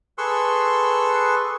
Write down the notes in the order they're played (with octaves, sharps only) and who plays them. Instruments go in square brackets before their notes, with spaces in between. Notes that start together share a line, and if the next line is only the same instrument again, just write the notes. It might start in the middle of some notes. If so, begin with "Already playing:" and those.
[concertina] G#4 A4 B4 C6 C#6 E6